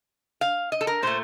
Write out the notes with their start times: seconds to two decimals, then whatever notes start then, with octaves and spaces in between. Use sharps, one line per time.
0.41 F5
0.72 D#5
0.81 A4
0.87 A#4
1.03 A#2 A3 C5